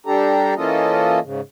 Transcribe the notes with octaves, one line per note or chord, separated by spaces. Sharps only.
G3 D4 G4 A4 A#5
E3 A#3 C#4 F4 A4 D#5
G#2 C#3